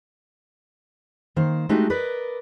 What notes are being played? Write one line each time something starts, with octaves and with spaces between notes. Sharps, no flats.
D#3 A#3 C5
G#3 A3 D4 D#4 F#4 G4
A#4 B4 D5 D#5